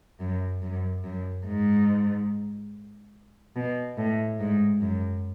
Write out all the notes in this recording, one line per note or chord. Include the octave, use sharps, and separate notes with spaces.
F#2
F#2
F#2
G#2
B2
A2
G#2
F#2